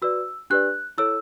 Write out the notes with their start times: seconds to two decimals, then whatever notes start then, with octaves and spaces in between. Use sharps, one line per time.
0.02 F#4 B4 D5 E6
0.50 D4 G4 B4 D5 F#6
0.98 E4 A4 C#5 E6